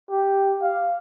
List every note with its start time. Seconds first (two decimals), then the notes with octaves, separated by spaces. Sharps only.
0.10 G4
0.62 F5